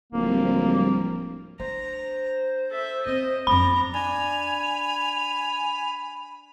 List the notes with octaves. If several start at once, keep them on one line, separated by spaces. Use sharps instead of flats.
D1 F3 G3 A#3 C4
D4 C5 A#5
A4 E5
C4 D#5
F2 B3 D4 A#5 B5
D4 G#5 B5 F7